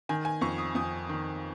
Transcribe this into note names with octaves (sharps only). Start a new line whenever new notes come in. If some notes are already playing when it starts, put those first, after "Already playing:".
D#3 G#5
G#5
F2 C#6
D#6
F2 D#6
D#3